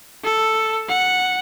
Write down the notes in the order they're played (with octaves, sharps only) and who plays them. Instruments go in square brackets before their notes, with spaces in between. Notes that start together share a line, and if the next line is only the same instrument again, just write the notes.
[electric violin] A4
F#5